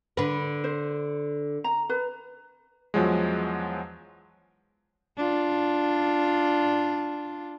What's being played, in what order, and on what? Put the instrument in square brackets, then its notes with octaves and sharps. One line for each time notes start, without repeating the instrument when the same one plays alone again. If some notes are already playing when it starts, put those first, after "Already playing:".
[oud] D3 B4
[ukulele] C5
A#5
B4
[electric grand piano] E2 F3 F#3 G#3
[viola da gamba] D4 F4